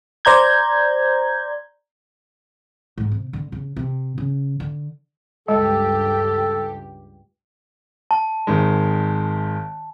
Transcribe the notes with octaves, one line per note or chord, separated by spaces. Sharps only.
C5 D5 A#5 G6 G#6
G#2
C3
D3
C#3
C3
C#3
D3
C#2 G2 G#3 G4 A4
A5
G#1 D#3 G#3